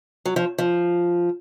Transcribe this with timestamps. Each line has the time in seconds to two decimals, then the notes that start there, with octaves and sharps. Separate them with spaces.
0.25 F#3
0.36 F3
0.58 F3